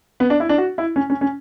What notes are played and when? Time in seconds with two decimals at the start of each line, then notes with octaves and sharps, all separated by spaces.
0.20 B3
0.30 D4
0.40 E4
0.49 D4
0.58 F#4
0.78 E4
0.96 C#4
1.10 C#4
1.21 C#4